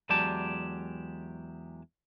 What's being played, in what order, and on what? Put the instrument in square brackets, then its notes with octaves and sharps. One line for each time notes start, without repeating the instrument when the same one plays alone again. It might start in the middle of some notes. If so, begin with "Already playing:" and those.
[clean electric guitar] E2 F#3 G#3 G4 D5 A5